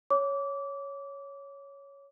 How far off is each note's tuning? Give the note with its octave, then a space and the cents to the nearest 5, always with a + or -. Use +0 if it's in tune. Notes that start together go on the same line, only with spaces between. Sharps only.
C#5 +0 D6 -25